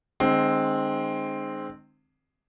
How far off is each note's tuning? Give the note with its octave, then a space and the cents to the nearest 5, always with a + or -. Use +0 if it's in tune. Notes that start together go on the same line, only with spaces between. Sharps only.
D#3 -45 G#3 +0 C4 +0